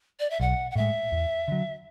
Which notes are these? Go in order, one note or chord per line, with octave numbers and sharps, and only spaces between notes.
D5
E5
B1 F#5
F#5
A2 G#3 E5
E2
D3 F#3